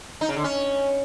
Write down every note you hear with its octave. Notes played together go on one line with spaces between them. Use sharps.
D#4
C#3
D3
C#4